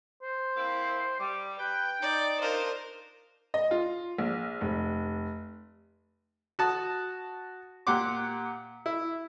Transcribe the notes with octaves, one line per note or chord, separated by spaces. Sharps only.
C5
A#3 C4 E4
G3 D6
B4 G5
D#4 D5
D4 F4 A#4 C5 D#5
D#5
F4
A#1
F1
F#4 A5 D#6
A#2 G4 F#5 C6 D6
E4